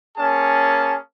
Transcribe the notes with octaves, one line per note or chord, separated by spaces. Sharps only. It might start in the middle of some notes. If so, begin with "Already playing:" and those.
A#3 C#4 G#4 A5